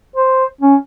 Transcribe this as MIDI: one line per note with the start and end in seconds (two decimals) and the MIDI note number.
0.16 0.45 72
0.61 0.76 61